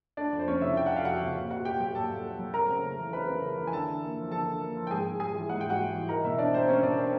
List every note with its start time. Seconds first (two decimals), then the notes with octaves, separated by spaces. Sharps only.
0.17 A3 D4 D5
0.32 F2
0.39 C5
0.46 F3 C#4 C#5
0.61 C3 E4 E5
0.76 A3 G5
0.86 F#5
0.91 F2 F5
1.05 F3 F#4 F#5
1.21 C3
1.36 A#2
1.50 A#2 F#4 F#5
1.65 A3 G4 G5
1.80 F#3 G4 G5
1.95 A#2 A4 A5
2.10 A#2
2.24 A3
2.39 F#3
2.54 C4 A#4 A#5
2.69 C#3
2.84 A3
2.99 E3
3.13 C4 B4 B5
3.28 C#3
3.42 A3
3.58 E3
3.67 G#5
3.73 D3 A4 A5
3.88 D3
4.03 A#3
4.17 F3
4.32 D3 A4 A5
4.47 D3
4.61 A#3
4.77 F3
4.87 G5
4.91 G#2 G#4 G#5
5.05 G#2
5.20 G3 G#4 G#5
5.35 E3
5.49 G#2 F#5
5.61 G#2 G5
5.70 F#4 F#5
5.79 G3
5.95 E3
6.09 D#4 A#4 A#5
6.24 B2 E4 E5
6.38 C4 D4 D5
6.53 G3 C4 C5
6.68 C#4 D#4 C#5
6.83 B2 D4 D5
6.98 C4 C5